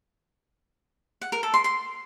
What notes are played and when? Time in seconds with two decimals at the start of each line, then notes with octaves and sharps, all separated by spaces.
1.21 F#5
1.32 A#4
1.43 A4
1.54 C6
1.64 C6